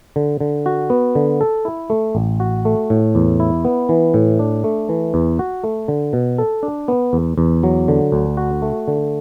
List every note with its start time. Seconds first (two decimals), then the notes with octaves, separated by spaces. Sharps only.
0.16 D3
0.41 D3
0.66 F#4
0.90 B3
1.15 D3
1.41 A4
1.65 E4
1.90 A3
2.15 A1
2.40 F#4
2.65 A3
2.90 A2
3.15 E2
3.40 E4
3.65 B3
3.89 E3
4.14 A2
4.39 D4
4.64 A3
4.89 E3
5.14 E2
5.39 F#4
5.64 A3
5.88 D3
6.13 B2
6.38 A4
6.63 D4
6.88 B3
7.13 E2
7.38 E2
7.63 F#3
7.88 D3
8.12 D2
8.37 F#4
8.62 A3
8.88 D3